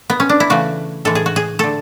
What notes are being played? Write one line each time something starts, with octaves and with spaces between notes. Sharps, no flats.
B3
C#4
D4
E4
C#3 E3 A3 F#4
A2 E3 G#3 A4
G#4
F#4
G#4
D3 A3 A4